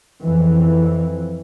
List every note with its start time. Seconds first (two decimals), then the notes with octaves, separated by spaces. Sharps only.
0.21 F2 E3